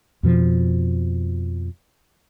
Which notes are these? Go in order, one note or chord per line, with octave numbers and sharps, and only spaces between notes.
F2 B2 F3